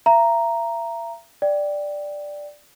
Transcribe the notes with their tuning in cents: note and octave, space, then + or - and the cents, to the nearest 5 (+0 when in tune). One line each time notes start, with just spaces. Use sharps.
E5 +40 A#5 +0
D5 +0 G5 +0